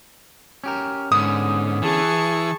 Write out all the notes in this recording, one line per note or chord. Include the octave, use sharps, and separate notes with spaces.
C#4 G4 A#4
G#2 D3 B3 C#4 D#6
E3 G#4 A5 C#6